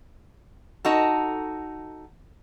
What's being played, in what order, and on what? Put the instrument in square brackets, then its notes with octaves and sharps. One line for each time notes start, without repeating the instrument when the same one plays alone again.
[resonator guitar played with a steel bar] D#4 F#4 A4